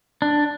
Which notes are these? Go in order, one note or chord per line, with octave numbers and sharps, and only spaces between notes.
D4